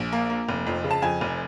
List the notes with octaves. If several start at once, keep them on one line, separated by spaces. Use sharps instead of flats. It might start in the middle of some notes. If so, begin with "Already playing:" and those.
Already playing: A#1
A#3
A#3
F1
F2
C#3
A5
F2 G#5
F1